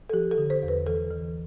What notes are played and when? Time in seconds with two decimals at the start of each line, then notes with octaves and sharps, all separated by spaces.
0.10 A4
0.13 F3 G4
0.31 A4
0.38 D3
0.50 C5
0.63 E2
0.68 B4
0.87 E3 A4
1.11 E3